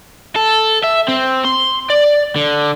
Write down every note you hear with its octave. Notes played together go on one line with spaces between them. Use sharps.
A4
E5
C4
C6
D5
D3